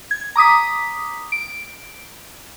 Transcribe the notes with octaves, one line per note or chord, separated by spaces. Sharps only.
G#6
A#5 D6 D#6 B6
D7